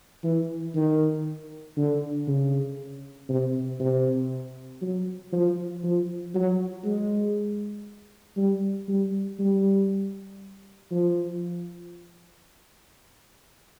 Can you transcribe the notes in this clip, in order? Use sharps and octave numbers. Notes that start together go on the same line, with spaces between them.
E3
D#3
D3
C#3
C3
C3
F#3
F3
F3
F#3
G#3
G3
G3
G3
F3